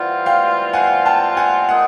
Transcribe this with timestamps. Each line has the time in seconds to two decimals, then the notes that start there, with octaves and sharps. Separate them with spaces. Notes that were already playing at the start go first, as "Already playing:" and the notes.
Already playing: E3 G3 C4 F4 F#5
0.26 F5 G5
0.73 F#5 G#5
1.05 G5 A5
1.37 F#5 G#5
1.68 D#3 G#3 C4 D#4 G#4 F#5